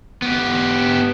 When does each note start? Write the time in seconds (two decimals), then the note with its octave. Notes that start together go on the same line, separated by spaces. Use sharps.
0.22 B3 G4